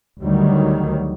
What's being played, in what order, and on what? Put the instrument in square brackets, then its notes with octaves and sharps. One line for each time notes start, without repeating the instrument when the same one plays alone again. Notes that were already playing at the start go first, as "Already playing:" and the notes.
[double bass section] D2 D#3 F#3 G3